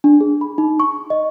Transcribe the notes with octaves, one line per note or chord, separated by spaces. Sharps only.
D4
G#4
B5
D#4
C#6
D#5